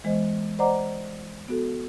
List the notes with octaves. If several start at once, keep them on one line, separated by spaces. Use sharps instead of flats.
E3 G#3 B3 C5 D#5
C5 D5 D#5 F#5 A#5 D6
B3 F#4 A4